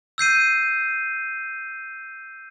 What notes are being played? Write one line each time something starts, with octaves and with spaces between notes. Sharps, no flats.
E6 G6 C7 D#7